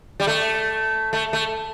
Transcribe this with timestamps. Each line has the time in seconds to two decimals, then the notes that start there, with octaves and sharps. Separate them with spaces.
0.20 G3
0.27 A3
1.13 A3
1.33 A3